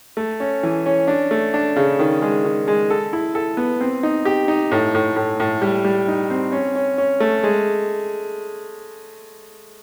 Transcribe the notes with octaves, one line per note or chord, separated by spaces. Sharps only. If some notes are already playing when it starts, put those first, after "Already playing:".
A3
C#4
E3
C#4
D4
A3
D4
C#3
D#3
G#3
D#3
G#3
A4
E4
A4
B3
C4
D#4
G4
D#4
A2
A2
A2
A2
G3
G3
D#4
C4
C#4
C#4
C#4
A3
G#3